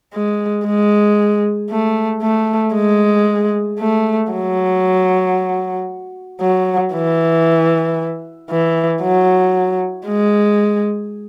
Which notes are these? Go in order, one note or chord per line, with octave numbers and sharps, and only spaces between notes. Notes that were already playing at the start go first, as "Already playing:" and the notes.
G#3
G#3
A3
A3
G#3
A3
F#3
F#3
E3
E3
F#3
G#3